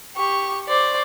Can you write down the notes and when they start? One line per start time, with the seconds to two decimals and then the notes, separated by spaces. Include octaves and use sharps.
0.16 G4 C#6
0.68 C5 D5